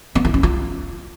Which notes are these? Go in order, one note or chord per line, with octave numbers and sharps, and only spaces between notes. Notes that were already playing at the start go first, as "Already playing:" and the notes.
B3
E4
C#4
F4